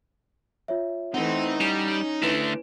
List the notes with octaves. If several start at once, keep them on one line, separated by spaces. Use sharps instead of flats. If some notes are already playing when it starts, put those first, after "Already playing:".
F4 C#5 E5
E3 A3 C4 D#4 F#5
G3 C#4
D3 A3 E4 B4 D7